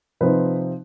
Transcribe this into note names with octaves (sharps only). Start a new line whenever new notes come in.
C3 F3 C4 D#4 B4